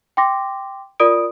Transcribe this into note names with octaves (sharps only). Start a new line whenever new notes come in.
G5 C6 D6 A#6
F4 A#4 D5 D#6 D7